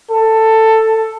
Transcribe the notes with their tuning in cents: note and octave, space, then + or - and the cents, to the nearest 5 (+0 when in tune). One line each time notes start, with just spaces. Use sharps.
A4 +10